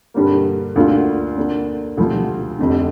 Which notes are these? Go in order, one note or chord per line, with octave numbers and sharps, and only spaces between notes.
G2 D3 G3 A#3
D2 D3 A#3 D4 F4
D3 A#3 D4
D2 C3 F3
F1 F2 D3